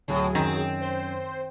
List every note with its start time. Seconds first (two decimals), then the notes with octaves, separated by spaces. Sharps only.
0.08 D1 A2 F#3 G#4
0.35 F#2 D#3 C4
0.81 C5